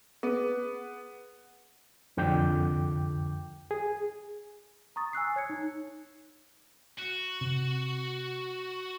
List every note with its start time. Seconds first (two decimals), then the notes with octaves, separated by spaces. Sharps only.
0.23 B3 G#4
2.17 C2 F2 D3 G5 D6 G6
3.71 G#4
4.96 A#5 C#6 D#6 A6
5.13 G#5 E6 F#6 C7
5.36 C#5 G#6 C#7
5.50 D#4
6.99 F#4
7.41 C3